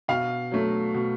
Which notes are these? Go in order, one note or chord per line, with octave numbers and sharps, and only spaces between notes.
B2 F5
F#3 A3
B2